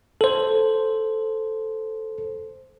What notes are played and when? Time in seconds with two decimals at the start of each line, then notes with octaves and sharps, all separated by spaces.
0.21 A4 C5